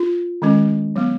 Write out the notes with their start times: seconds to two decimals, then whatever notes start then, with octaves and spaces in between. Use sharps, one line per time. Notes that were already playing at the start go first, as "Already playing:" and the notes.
Already playing: F4
0.42 D#3 G#3 C#4
0.96 F#3 B3